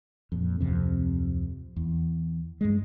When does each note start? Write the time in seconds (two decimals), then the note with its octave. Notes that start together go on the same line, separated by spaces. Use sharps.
0.32 F2 A#2
0.61 D1 G#1 F2 C3
1.76 E2
2.61 G2 G#3